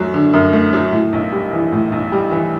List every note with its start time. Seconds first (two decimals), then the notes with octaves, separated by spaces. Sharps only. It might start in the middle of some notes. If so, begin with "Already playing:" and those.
Already playing: F#2 F#3 A3
0.14 D3
0.33 F#2
0.53 A3
0.73 F#3
0.93 A2
1.13 B1
1.32 G3
1.53 E3
1.72 A2
1.92 B1
2.12 G3
2.31 E3